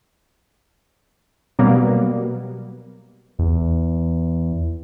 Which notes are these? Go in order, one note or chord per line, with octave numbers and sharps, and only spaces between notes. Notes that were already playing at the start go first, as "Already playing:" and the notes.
B2 F#3 G3 A#3 B3
E2